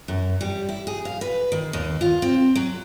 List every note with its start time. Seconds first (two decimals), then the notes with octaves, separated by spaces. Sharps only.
0.08 F#2
0.41 G3
0.69 E4
0.87 G#4
1.05 F5
1.21 B4
1.52 D#3
1.73 D#2
2.01 F4
2.22 C4
2.55 F#3